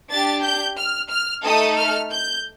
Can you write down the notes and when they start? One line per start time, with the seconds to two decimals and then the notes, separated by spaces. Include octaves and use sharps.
0.10 D4 G4 A6
0.43 G6
0.77 F6
1.10 F6
1.44 A3 D#4 A4 D#6
1.77 F6
2.11 G6